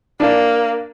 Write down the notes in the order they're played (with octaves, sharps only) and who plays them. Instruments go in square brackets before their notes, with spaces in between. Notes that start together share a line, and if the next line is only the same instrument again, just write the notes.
[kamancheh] A#3 [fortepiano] D4